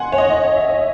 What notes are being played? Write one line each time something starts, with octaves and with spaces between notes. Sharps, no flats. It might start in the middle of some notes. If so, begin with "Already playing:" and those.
Already playing: F#5 G#5 C6
C#5
D#5
D#5
C#5
E5
D#5